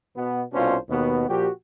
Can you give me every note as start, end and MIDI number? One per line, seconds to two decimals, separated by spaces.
0.16 0.44 47
0.16 0.44 59
0.53 0.77 36
0.53 0.77 47
0.53 0.77 61
0.53 0.77 62
0.53 0.77 65
0.53 0.77 72
0.90 1.28 39
0.90 1.28 47
0.90 1.28 59
1.28 1.49 46
1.28 1.49 53
1.28 1.49 66
1.28 1.49 67